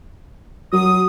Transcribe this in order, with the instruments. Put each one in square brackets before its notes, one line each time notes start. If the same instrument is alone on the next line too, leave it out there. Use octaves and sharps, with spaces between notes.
[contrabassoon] F#3 [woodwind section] D#6